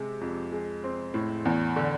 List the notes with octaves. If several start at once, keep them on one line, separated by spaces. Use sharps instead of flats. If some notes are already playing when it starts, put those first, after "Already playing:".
Already playing: C3 G#3
F2
G#3
C4
A2
E2
D3